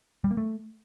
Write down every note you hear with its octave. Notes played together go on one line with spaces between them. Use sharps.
G3
A#3
A3